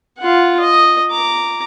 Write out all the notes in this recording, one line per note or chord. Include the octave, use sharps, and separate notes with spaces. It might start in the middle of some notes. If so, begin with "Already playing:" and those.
F4 F#5
D#5
A#5 D6